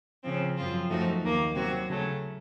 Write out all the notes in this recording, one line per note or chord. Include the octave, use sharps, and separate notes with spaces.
C#3 F3 C4
F#2 F3 C4 F4
F#2 F3 A3 D#4 F#4
D#2 D#3 A#3
C3 F#3 C4 F#4
C#3 F#3 A3